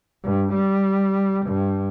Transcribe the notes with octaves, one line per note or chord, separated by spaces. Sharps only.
G2
G3
G2